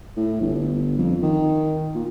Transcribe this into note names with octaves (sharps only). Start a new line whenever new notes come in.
A2
G1
F2
D#3
A#2